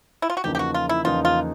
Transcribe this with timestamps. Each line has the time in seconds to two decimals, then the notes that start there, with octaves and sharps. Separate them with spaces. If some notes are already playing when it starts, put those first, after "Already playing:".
0.22 E4
0.30 F4
0.37 F#4
0.44 E2 C#3 F3 A#3 D#4 G4
0.55 G4
0.59 F#4
0.74 F4
0.89 E4
1.05 E2 C#3 F3 A#3 D#4 F4
1.25 F4